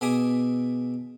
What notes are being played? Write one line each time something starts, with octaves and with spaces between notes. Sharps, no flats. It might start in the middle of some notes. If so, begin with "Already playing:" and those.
B2 G#4 E5 D6 D#6